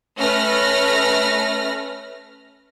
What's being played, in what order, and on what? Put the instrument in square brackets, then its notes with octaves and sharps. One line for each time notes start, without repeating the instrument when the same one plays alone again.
[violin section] A3 C#4 B4 F6 A#6